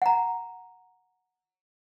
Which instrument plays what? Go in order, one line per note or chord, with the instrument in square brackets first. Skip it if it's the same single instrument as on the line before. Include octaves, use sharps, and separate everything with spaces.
[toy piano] F#5 A#5